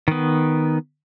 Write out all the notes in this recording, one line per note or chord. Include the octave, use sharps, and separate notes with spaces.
D#3 B3